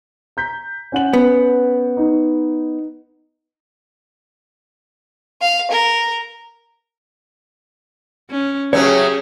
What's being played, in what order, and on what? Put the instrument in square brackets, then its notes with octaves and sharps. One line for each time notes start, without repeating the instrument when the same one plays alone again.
[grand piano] A#5 G6 B6
C#4 F#5 F#7
[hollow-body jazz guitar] B3
[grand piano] D#4
[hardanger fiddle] F5
A#4
[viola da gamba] C#4
[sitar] A2 C#3 F#3 [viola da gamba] C#4 G4 G#4 [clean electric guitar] C#5